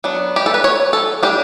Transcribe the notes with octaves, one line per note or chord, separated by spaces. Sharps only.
F#3 B3 D4
G4
A4
B4
C#5
A4
G3 D4 G4